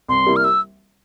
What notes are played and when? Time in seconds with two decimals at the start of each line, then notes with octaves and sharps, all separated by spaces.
0.08 C2 C6
0.27 C3 G3 A#3 E4
0.36 F6
0.44 E6